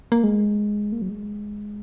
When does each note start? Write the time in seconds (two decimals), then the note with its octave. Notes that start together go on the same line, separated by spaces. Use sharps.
0.12 A#3
0.24 G#3
0.92 A#3
1.02 F#3
1.09 G#3